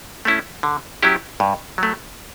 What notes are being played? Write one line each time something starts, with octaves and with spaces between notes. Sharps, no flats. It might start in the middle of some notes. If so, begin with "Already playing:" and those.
A3 C#4 E4
D3
F#3 C#4 E4 G4
G2
F#3 A3